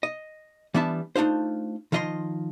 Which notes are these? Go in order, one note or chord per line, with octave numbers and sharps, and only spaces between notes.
D#5
E3 G3 B3 D4 E5 A5
A3 D4 D#4 F4 C5
D#3 F3 F4 D#5 E5 C6